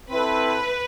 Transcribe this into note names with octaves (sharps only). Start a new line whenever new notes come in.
C4 E4 A4 B4